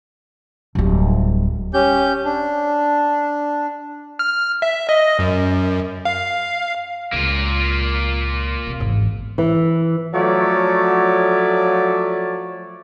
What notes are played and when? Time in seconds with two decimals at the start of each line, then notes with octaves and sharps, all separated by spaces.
0.75 D1 G3
1.74 C#4 G4 G6
2.25 D4
4.19 F6
4.62 E5
4.89 D#5
5.19 F#2
6.05 F5
7.13 C#2 A#3 F4
8.67 C3
8.80 G#1 E2
9.38 E3
10.14 F3 F#3 A3 C#5 D5